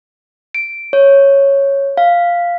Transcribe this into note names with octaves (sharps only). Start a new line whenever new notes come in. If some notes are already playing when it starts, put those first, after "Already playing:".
D7
C#5
F5